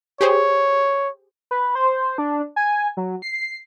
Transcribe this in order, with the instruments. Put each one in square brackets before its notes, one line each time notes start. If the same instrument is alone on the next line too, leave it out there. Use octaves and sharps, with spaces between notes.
[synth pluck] G4 G#4 C5 [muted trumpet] C#5
[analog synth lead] B4
C5
D4
G#5
F#3
C7